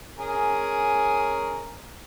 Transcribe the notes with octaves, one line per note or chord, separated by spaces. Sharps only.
C#4 G#4 A#4